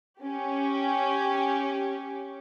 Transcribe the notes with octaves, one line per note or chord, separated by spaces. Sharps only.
C#4 G4